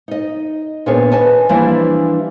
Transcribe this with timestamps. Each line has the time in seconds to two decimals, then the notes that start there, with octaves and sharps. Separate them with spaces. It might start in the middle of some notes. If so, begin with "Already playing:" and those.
0.08 D#4 D#5
0.86 A#2 B3 D4 G#4 A#4 C#5
1.12 B4 D#5 G#5 A5
1.49 E3 F3 G3 A#3 D4 E4